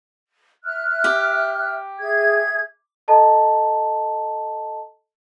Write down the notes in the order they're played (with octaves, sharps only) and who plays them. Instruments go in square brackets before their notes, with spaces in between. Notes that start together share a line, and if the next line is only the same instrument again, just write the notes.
[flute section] E5 F6 F#6
[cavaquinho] G4
[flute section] G#4 E5 G#6
[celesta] A4 D#5 A5 A#5